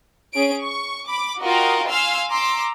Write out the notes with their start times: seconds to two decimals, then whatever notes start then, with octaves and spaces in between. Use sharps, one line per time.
0.33 C#4 G#4 D7
0.64 C#6
1.07 B5 D6
1.41 F4 F#4 A#4 D#5 F5 G5
1.88 F5 G#5 C6 E6 F6
2.30 A#5 C6 D6 E6